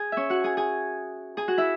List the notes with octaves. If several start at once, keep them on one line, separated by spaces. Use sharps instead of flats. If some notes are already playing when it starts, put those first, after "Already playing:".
Already playing: G#4 G#5
C#4 C#5 E5
F#4 F#5
G#4 G#5
G#4 G#5
G#4 G#5
F#4 F#5
E4 E5